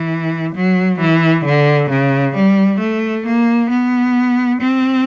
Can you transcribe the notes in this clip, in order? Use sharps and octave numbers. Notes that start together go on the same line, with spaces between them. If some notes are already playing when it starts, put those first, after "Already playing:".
Already playing: E3
F#3
E3
D3
C#3
G3
A3
A#3
B3
C4